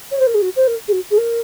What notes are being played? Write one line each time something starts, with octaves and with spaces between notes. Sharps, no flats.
C#5
C5
A#4
G#4
F#4
C5
A#4
G#4
F#4
G#4
A#4